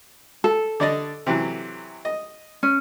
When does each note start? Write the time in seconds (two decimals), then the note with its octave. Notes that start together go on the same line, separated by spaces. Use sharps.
0.44 A4
0.80 D3 D5 D#5
1.26 C3 E3 F#3
2.05 D#5
2.63 C#4